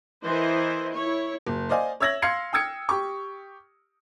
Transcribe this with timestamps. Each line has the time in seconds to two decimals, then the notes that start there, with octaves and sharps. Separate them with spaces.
0.23 E3 E4 A#4 C5 D#5
0.93 E4 C#5
1.47 F#1
1.69 C5 D5 D#5 F5 G#5
2.00 C#5 E5 E6 G#6 A#6 F#7
2.22 F5 C6 F6 G#6 C7 C#7
2.53 G5 D#6 E6 G#6 C#7
2.89 G4 C#6